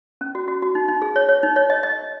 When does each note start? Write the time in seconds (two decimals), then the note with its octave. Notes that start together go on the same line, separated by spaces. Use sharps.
0.21 C#4
0.35 F#4
0.48 F#4
0.62 F#4
0.75 D#4
0.88 D#4
1.02 G#4
1.16 C#5
1.29 C#5
1.43 D#4
1.56 C#5
1.70 D#5
1.83 D#5